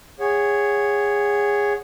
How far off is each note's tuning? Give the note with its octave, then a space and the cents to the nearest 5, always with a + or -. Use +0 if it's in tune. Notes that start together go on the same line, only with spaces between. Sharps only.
G#4 -20 C#5 +0 F#5 +0